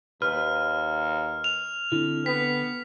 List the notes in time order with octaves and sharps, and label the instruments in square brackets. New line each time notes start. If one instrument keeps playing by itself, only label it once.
[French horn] D#2 [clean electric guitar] B4 [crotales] F6
[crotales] F7
[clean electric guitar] D3 [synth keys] C4 E4
[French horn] B3 [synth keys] G5 [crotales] B6